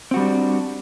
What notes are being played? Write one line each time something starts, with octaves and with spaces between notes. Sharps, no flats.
G3 C4 D4 F#4